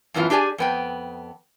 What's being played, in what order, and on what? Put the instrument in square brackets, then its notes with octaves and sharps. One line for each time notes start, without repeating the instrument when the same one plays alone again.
[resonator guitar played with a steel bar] F#2 A2 E3 B3 F4
D4 G4 G#4 D5 G#5
F2 B3 G5